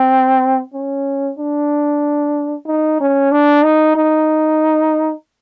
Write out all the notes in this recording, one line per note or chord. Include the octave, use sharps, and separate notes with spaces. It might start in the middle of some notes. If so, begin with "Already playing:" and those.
Already playing: C4
C#4
D4
D#4
C#4
D4
D#4
D#4